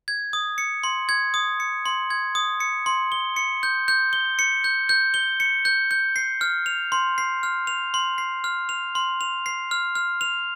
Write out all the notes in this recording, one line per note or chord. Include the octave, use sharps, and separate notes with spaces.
G#6
D#6
C#7
C6
G#6
D#6
C#7
C6
G#6
D#6
C#7
C6
G7
C#7
G6
G6
G7
C#7
G6
G6
G7
C#7
G6
G6
C7
F6
F7
C6
C7
F6
F7
C6
C7
F6
F7
C6
F7
C7
F6
F6
F7